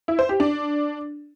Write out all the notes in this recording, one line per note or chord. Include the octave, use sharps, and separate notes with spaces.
E4
C5
G4
D4